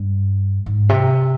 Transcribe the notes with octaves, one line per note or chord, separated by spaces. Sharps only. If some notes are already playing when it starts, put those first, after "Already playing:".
Already playing: G2
G#2
C3